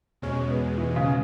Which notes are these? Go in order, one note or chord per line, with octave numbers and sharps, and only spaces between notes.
E2 B2 G#3 C#4
B3
E3
C#3